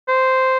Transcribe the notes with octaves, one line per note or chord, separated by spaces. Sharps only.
C5